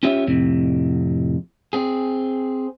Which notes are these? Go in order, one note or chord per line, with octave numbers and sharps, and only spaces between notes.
C#4 F4 G4 C#5 E5
F2 A2 C3
C4 G#4